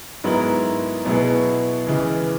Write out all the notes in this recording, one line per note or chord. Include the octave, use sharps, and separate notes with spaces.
G#2 F#3 B3 E4 A#4
B2 F#3 B3 E4 G#4
C#2 C#3 E3